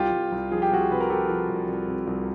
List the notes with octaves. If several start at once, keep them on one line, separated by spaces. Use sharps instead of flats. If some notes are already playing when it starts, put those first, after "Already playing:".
Already playing: C2 F4 G4
C2
C2
F3 G#4
G4
C2 F#4 G#4
C3 B4
A#4
F3 G4 A4
F3
C2
C2
C3
C2